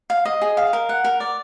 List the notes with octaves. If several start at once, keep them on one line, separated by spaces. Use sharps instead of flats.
F5
D#5
G#4
F5
A#4
F#5
A#4
D5